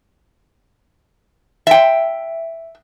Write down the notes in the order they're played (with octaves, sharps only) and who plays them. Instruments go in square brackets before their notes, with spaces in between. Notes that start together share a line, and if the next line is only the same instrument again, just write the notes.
[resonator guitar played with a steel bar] E5 G5